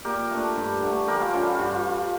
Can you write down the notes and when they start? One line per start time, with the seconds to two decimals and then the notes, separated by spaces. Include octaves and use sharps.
0.05 A#2 G4 A#4
0.31 A3 D4
0.56 G2
0.83 D3 A3
1.08 E3 G4 A#4
1.21 F4 A4
1.33 G3 C#4 F4 A4
1.47 F4
1.59 G2 F4